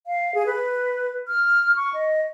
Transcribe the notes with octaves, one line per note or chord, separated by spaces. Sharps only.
F5
G#4
B4
F6
C#6
D#5